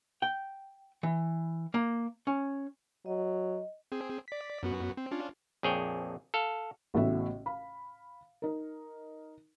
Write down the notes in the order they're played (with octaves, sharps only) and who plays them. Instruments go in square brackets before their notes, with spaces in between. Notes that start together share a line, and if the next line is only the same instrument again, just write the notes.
[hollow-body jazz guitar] G5
E3
A#3
C#4
[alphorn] F#3 [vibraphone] D#5
[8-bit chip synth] C4 G#4
D5 B6
F#2 B3 F#4
C4
C#4 D4 F4
[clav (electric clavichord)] A#1 F2 G#4 C#5 G5
A4 F5
[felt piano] A1 A2 C#3 B3 F#4 E5
F5 B5
D#4 A#4